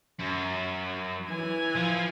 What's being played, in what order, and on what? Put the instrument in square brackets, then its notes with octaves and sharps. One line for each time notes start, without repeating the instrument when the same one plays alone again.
[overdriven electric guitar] F#2
[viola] E3 G#5
[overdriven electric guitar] F3